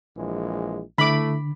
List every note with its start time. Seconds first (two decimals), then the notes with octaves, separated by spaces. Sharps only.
0.16 A#1 E3 G#3
0.98 D3 A3 E4 B5 D6